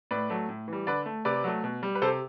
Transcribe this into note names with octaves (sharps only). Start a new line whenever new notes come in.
A2 B4 D5
F#3 A3
A2
E3 G3
D3 B4 D5
A3
C3 B4 D5
F#3 A3
B2
G3
B4
C3 A4 C5